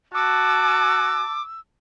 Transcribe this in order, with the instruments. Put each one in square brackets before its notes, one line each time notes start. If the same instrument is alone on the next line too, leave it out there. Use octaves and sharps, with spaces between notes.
[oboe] F#4 [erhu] A5 [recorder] D6 [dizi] E6